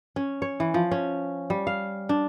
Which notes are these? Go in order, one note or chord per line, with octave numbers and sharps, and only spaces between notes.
C#4
C#5
E3
F3
C#4
G3
F5
D4